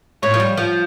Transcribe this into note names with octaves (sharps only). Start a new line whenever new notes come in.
A2 C#5
F3
G3
F3